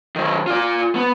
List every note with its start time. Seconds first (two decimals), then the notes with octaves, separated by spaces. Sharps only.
0.16 D#3 F#3
0.47 F4 D5
0.95 B3